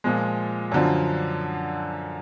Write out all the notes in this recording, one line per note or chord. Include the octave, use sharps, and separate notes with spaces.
A#2 F3 G#3
F#2 D3 F3